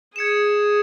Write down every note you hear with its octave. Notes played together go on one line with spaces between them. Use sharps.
G#4 G#6 C#7 E7